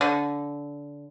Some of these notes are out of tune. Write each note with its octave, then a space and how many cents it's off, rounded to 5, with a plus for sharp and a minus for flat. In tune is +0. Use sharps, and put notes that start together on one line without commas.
D3 -20